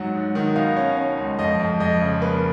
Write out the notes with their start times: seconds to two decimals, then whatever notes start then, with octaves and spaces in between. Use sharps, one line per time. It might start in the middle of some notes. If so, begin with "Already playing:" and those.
Already playing: G#2 F#3 F#5
0.15 G#2
0.35 D#3
0.56 B2 F5
0.77 C#4
0.97 C#4
1.18 C#2
1.38 F2 D#5
1.59 F2
1.80 F2 D#5
2.01 C#3
2.21 A#3 B4